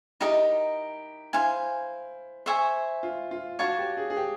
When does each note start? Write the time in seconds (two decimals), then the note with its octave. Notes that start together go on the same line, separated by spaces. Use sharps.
0.20 D#4 E4 G4 A#4 D#5
1.33 E4 C5 F5 G#5
2.46 C5 E5 G#5 C#6
3.03 F4
3.31 F4
3.59 F#4 C#5 F5 A5 D6
3.79 G4
3.97 G#4
4.10 G#4
4.17 G4